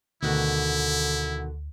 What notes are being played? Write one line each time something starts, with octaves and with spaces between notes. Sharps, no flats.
D2 B2 D3 D#3 E4 F#4